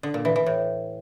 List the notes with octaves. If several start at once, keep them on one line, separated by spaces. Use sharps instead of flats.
D3
A#2
E3
E3
A2